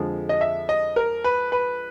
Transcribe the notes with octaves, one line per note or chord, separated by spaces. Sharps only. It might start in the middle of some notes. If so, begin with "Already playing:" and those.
Already playing: F2 D3 F3 G#3
D#5
E5
D#5
A#4
B4
B4